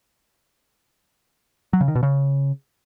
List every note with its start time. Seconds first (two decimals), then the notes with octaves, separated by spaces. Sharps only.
1.73 F#3
1.81 C#3
1.88 D#3
1.95 B2
2.03 C#3